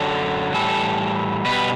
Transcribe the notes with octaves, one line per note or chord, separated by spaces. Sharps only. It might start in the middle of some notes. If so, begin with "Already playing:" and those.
Already playing: F#2 D3 F#3 A4
A2 E3 G3 A4
B2 G3 B4